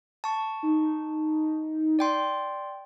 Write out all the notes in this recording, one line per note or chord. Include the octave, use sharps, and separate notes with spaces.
A5 C#6
D#4
D5 G5 C6